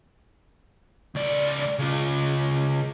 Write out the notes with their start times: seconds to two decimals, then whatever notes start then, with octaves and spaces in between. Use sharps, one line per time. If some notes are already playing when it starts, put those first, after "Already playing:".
1.15 C#2 D5
1.79 C#3 F4